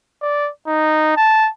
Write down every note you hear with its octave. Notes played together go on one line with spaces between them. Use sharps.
D5
D#4
A5